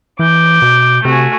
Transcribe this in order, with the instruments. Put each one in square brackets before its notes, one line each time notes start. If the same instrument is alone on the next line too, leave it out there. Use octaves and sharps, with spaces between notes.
[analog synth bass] E3 [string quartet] D6 G6
[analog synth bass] B2
[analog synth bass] C3 [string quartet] A3 F#4 G#5